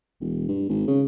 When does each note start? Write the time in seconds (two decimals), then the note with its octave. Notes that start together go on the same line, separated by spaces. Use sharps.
0.20 E1
0.49 G2
0.69 G#1
0.87 C#3